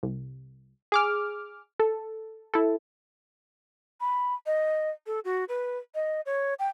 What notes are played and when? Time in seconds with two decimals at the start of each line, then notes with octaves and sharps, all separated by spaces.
0.03 C2
0.92 G#4 D6 F6
1.80 A4
2.54 E4 A4
4.01 B5
4.46 D#5
5.07 A4
5.25 F#4
5.49 B4
5.95 D#5
6.26 C#5
6.59 G5